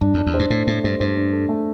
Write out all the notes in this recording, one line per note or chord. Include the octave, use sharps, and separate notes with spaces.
G2 D4
F2 D4
E2
C5
G2
A2 A3
A2 A3
G2 C5
G2 C5
D4
A4
A3